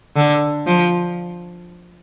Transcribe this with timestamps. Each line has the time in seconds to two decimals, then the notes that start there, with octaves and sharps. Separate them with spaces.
0.16 D3
0.67 F3